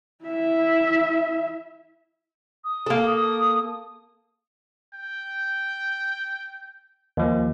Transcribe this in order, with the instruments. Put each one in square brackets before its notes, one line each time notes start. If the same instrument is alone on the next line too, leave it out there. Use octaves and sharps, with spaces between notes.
[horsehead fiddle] E4 E5
[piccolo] D#6
[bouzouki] A#3 A4
[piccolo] D#6
[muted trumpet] G5
[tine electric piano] D#2 F3